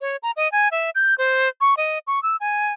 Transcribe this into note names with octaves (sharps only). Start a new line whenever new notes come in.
C#5
A#5
D#5
G#5
E5
G6
C5
C#6
D#5
C#6
E6
G#5